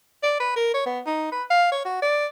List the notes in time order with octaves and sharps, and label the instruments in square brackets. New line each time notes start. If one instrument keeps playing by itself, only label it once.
[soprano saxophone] D5
B4
A#4
C#5
B3
D#4
B4
F5
C#5
F#4
D5